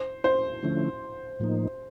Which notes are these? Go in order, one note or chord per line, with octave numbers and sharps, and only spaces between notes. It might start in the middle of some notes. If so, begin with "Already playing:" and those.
Already playing: C5
C5
D3 F3 A3 C#4 E4
A2 F3 A#3 D#4